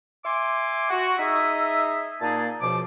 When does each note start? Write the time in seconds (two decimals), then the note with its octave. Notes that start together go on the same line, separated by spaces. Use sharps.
0.25 E5 G#5 C6 D6
0.90 F#4
1.19 D#4 G#4 D#5 E5
2.21 A#2 A#3 D#4 G#4 A5
2.62 C#2 B2 F3 D6